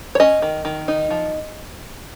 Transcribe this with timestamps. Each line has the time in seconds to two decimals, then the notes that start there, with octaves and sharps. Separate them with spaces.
0.15 C#5
0.20 C#4 D#5
0.42 D#3
0.65 D#3
0.88 D#4
1.10 F3